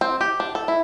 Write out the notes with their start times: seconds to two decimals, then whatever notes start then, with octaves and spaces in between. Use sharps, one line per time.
0.01 C4
0.21 G4
0.40 D4
0.55 A4
0.68 E4